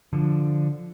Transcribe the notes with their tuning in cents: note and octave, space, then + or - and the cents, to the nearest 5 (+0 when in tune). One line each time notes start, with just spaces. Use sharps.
D3 +0 F3 +0